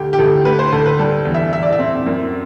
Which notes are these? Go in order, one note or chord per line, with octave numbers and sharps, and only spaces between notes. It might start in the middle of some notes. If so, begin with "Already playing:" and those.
Already playing: D2 G4
G4
D2 A4
A3 B4
C5
D2 A4
B4
G3 A4
E2
E5
E2 E5
D5
E5
C4
F#2